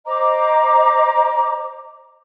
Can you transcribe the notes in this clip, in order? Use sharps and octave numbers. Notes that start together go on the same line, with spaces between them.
C5 D#5 A#5 D6